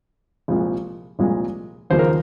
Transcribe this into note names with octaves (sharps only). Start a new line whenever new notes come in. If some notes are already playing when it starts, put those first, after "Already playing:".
C2 A#2 F3 G#3
C2 A#2 F3 G#3
D#2 C#3 F3 A#3 C5
A#4